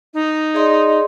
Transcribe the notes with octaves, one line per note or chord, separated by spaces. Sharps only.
D#4
G#4 D5 D#5 C6